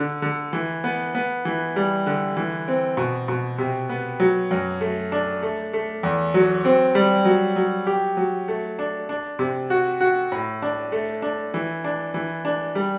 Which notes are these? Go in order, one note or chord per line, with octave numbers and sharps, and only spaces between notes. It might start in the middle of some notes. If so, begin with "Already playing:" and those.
Already playing: D3
D3
E3
B3
B3
E3
G3
D3
E3
C4
B2
B2
C3
B3
F#3
F#2
A3
D4
A3
A3
E2
F#3
C4
G3
F#3
F#3
G4
F#3
A3
D4
D4
C3
F#4
F#4
A2
D4
A3
D4
E3
D4
E3
D4
G3